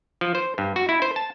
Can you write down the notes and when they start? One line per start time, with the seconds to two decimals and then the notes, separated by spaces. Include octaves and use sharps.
0.21 F3
0.35 C5
0.58 G2
0.76 F#4
0.89 E4
1.02 C5
1.16 A5